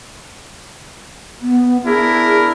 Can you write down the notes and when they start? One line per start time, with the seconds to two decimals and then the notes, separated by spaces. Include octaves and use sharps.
1.41 B3
1.85 D4 E4 G#4 A#4